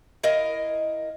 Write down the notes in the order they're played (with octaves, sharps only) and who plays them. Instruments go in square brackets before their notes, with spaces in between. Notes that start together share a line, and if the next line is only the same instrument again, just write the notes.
[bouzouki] E4 A#4 D#5 F5